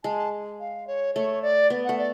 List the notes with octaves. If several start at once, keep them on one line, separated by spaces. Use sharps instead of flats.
G#3 A5
F5
C#5
A3 C#5
D5
B3
A3 F#5
D5